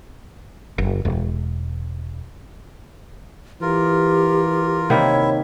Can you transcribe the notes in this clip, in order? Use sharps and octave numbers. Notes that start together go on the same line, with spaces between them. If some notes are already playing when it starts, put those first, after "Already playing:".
F#1
E1
E3 F4 G4 A#4
C3 D#3 A#3 E4 C#5 E5